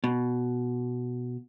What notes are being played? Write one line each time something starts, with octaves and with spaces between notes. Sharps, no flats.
B2